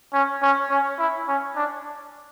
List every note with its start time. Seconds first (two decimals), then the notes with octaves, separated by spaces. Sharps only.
0.14 C#4
0.43 C#4
0.70 C#4
0.99 E4
1.28 C#4
1.56 D4